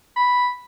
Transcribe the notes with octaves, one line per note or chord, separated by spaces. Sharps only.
B5